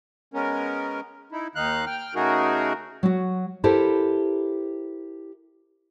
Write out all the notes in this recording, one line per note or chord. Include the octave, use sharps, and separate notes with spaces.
G#3 B3 C#4 A#4
D#4 E4
D#2 D#3 D#4 F5 F#6
G5 F6
C#3 A3 D#4 F#4 G#4 A#4
F#3 F#4
E4 G4 A4 A#4 C5